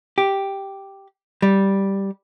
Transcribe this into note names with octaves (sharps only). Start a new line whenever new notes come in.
G4
G3